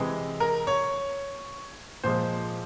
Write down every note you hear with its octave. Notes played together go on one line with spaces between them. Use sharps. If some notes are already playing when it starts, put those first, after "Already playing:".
Already playing: C3 E3 G#3
A#4
C#5
A#2 F3 G#3 C5